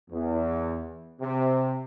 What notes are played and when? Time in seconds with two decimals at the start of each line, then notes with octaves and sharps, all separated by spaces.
0.10 E2
1.21 C3